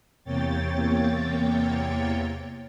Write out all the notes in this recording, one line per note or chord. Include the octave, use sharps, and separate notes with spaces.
E2 C3 A#3 C#5 G5 A6